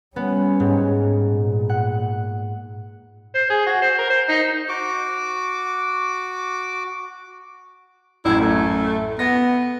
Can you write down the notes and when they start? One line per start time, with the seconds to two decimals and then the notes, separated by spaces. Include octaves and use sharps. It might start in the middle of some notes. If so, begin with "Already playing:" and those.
0.16 G3 B3 C#4
0.60 G#2
1.23 A#2
1.69 F#5
3.35 C5
3.50 G#4
3.66 F#4
3.82 C5
3.99 A#4
4.10 C5
4.29 D#4
4.69 F#4 D6
8.25 A1 F#2 E4 G#6
8.41 A3
9.19 B3 A#6